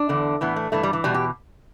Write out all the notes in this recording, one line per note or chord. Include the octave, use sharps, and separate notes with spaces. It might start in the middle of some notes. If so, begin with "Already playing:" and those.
Already playing: D4
E2 D3
A2 E3 B3
A3
G2 E3 A3
G3
E3
E2 B2 G3
G4